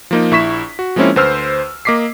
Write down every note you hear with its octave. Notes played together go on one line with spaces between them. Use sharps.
F3 A#3 D#4
A#1 E4 C#6 B6 E7
F#4
F3 G#3 A#3 C4 C#4 E4
D2 B4 C5 E6 F6
A#3 D#5 D6 B6 C7